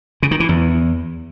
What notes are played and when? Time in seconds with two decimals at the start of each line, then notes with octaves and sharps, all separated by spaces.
0.23 C#3
0.31 D#3
0.40 E3
0.49 E2